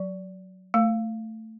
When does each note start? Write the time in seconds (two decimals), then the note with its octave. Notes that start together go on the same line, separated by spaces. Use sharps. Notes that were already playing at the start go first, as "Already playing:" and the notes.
Already playing: F#3
0.74 A3